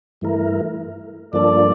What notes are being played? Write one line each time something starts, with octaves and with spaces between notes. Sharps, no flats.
G2 E3 A3 E4 A#4
G2 F3 A#3 D4 A4 D5